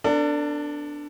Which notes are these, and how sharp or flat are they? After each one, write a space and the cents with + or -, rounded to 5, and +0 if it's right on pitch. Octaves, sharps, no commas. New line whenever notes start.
B3 +40 D4 +0 A4 +45